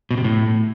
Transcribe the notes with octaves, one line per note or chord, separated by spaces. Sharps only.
B2
C3
A2